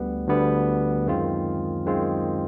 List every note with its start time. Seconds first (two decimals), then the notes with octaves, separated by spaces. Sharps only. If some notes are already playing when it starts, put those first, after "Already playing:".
Already playing: D2 D3 G3 B3
0.28 D2 D3 G3 B3
1.06 F#2 D#3 G#3 C4 F4
1.86 F#2 D#3 G#3 C4 F4